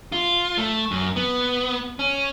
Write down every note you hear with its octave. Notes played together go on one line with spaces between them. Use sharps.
F4
A3
F#2
B3
C#4